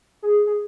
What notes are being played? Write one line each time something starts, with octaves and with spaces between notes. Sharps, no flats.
G#4
G#4